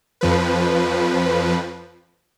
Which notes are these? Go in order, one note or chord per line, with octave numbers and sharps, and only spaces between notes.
F2 F3 B4